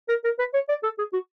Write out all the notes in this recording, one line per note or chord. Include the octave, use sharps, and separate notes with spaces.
A#4
A#4
B4
C#5
D5
A4
G#4
F#4